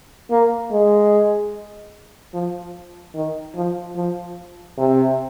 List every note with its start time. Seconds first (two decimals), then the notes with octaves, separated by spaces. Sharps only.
0.31 A#3
0.71 G#3
2.34 F3
3.15 D#3
3.56 F3
3.96 F3
4.78 C3